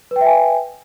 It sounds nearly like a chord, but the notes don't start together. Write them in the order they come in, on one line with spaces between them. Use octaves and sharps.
B4 G5 E5 G#5